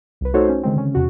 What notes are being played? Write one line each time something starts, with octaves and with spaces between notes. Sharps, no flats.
C2 B4
A3 D#4 F#4 A4 C5 C#5
C#4
D3 D#3 G#3 C4
C#3 C#4
E2 C3 F#4